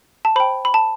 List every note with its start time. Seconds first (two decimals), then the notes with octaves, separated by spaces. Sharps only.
0.25 A5
0.36 C5 G5 B5
0.65 B5
0.74 A5